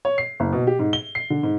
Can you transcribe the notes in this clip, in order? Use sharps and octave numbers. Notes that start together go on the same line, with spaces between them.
C#5
C7
F#1
B2
G4
G#2
G7
C7
D3
G#2